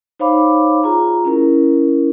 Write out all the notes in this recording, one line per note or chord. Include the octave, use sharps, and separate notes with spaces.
D#4 C5 C#5 F5 B5 D6
F4 G#4 A#5
C#4 E4 A#4